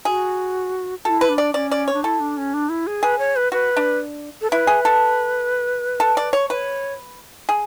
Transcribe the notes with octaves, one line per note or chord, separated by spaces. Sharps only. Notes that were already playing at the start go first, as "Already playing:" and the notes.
F#4 G#4
E4 F#4 A4
B4
D4
D5
C#4 D5
D5
C#5
D4
E4 A4
D4
C#4
D4
E4
G#4
G#4 B4
C#5
B4
F#4 B4
D4
A4
E4 B4
G#4
A4
A4
D5
C#5
B4 C#5
G#4